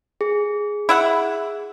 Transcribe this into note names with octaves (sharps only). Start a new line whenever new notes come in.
G#4
E4 E5 F#5